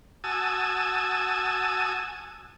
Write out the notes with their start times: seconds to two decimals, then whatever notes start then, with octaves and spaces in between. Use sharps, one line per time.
0.24 F#4 G#5 A5 D#6 E6